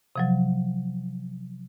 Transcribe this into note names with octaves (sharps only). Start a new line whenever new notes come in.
C3 F3 F#3